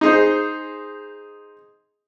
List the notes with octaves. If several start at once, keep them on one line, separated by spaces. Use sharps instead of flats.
D#4 G#4 C5